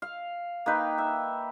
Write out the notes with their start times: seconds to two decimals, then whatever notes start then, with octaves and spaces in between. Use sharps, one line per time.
0.02 F5
0.66 A#3 D#4 B4 G5
0.98 E5